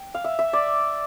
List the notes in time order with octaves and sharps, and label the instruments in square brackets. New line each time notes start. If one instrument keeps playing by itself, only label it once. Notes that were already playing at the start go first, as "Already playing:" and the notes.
Already playing: [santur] G5
F5
E5
E5
D5